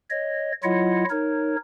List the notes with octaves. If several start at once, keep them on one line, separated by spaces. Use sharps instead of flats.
C#5 D#5
F#3 E4 F4 C#5 D#5 F#5
D#4 A#4 C#5